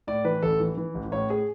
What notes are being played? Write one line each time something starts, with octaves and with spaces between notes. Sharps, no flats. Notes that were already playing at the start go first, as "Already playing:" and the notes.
A2 D5
E3 B4
A1 A4
E3
E3
A1
A2 C#5
G#4